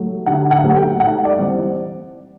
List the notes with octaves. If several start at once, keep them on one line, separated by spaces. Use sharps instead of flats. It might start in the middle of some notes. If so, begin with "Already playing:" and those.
Already playing: F#3 A3
D3 F#5
F#5
F#3 A3
G5
G#2 F#5
D5
E3 G3 C4